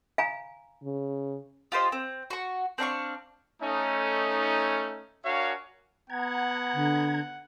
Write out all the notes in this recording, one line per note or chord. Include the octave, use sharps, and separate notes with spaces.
F5 G#5 A#5
C#3
F4 G4 C5 D#5
C4
F#4 C#6
C4 D4 F5 C#6
A3 C#4 D#4
D4 F#4 A#4 C#5 F5 G#5
B3 F#5 A#5 G#6
D3